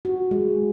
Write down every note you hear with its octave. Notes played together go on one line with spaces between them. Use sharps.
F#4
G#3